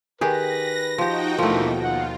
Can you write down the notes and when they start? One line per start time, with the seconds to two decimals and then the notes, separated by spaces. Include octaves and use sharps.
0.21 D#3 G4 G#4 B4 A#6
0.98 F3 D#4 F#4 G4 G5
1.39 D#2 B2 D3 E3 F3 A3 A#4
1.84 F4 F#5